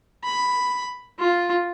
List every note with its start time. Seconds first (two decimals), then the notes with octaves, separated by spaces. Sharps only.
0.24 B5
1.19 F4